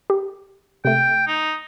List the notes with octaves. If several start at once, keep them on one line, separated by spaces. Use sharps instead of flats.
G4
C3 A3 G5
D#4